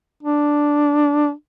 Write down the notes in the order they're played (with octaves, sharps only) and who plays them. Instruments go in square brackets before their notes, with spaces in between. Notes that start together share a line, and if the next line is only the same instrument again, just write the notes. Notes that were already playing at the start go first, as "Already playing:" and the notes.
[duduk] D4